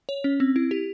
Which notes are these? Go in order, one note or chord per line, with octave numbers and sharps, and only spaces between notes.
C#5
C#4
C4
E4
G4